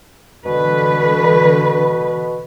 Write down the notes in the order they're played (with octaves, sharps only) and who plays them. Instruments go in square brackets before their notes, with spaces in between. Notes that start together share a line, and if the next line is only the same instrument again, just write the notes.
[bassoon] B2 [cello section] D3 E3 B4